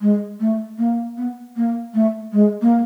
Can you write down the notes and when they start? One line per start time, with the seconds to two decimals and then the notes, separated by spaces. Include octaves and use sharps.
0.01 G#3
0.40 A3
0.78 A#3
1.18 B3
1.56 A#3
1.94 A3
2.33 G#3
2.62 A#3